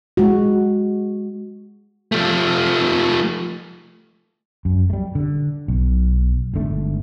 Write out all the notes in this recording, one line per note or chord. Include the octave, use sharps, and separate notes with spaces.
G#3 F#4
F3 A3
F#2
G3 A3
D3
B1
G1 G#2 D3 A3